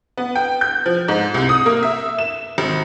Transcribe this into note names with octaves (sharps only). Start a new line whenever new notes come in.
B3
G5
G6
F3
G#2
C2
D#6
A#3
E5
E7
G#1